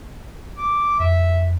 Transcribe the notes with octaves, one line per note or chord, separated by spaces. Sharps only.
D6
F2 E5